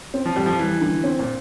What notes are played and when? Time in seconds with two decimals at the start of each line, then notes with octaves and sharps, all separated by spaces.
0.14 C4
0.25 F3
0.36 F2 G3
0.46 F3
0.59 E3 G3
0.81 D3
1.04 C4
1.19 A#2